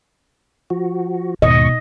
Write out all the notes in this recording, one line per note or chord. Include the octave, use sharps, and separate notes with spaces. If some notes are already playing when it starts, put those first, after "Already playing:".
F3 F#4
D#2 G#2 B2 D#5 C#6